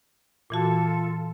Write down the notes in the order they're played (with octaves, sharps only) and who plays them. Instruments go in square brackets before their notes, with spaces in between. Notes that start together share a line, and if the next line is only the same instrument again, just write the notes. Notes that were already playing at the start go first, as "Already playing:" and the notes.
[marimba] A#2 E3 F#4 [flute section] F4 A4